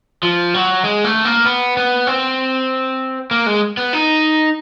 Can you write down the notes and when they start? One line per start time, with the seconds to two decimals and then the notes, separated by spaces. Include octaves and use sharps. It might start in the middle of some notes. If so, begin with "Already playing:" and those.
0.23 F3
0.54 F#3
0.84 G#3
1.04 A3
1.25 A#3
1.45 B3
1.77 B3
2.07 C4
3.31 A#3
3.46 G#3
3.77 B3
3.93 D#4